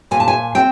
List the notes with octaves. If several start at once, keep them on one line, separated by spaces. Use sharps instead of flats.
A#2 G#5
A5
G#5
C4 G5